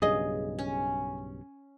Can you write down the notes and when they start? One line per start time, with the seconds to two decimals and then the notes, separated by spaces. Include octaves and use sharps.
0.02 B1 G2 C#3 G#4 D#5
0.59 C#4